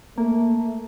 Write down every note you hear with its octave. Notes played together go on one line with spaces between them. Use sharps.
A3 A#3